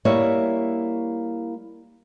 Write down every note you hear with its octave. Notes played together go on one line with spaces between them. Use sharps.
G3 A#3 E4 C#5 E5